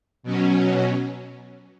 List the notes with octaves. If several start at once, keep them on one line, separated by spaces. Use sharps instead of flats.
B2 F#3 C#4